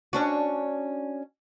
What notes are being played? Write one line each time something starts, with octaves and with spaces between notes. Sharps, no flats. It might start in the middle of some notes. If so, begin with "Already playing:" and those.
C#4 D4 F#4